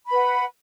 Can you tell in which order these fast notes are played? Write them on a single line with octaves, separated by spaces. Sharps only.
B5 B4 F#5